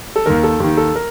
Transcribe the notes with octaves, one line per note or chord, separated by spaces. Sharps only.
A4
D#2 D#3 A#4
A4
D#2 D#3 G4
A4
A#4